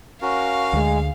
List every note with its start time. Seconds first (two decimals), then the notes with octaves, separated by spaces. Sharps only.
0.22 C#4 F#4 A#4 F5
0.73 D2 G#3